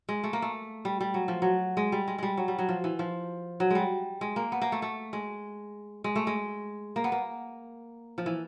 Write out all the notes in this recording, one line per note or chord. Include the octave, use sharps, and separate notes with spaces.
G#3
A3
A#3
A3
G3
G3
F#3
F3
F#3
G#3
G3
G#3
G3 G#3
F#3
G3
F#3
F3
E3
F3
F#3
G3 G#3
G#3
A#3
B3
A#3
A3
A3
G#3
G#3
A3
G#3
A#3
B3
A#3
F3
E3